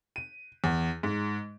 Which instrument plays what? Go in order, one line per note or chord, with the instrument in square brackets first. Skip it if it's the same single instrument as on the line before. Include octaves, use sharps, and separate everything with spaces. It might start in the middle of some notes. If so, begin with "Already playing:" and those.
[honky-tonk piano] D#7
E2
G#2